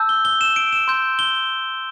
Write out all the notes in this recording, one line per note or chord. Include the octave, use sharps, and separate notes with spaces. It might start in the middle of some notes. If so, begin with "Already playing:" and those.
Already playing: A5 E6 G6
G7
G7
E7
D7
E7
C6 G6
G7